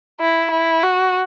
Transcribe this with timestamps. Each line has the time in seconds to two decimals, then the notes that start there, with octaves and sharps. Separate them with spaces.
0.20 E4
0.51 E4
0.83 F#4